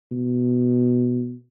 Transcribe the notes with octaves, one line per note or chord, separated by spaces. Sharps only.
B2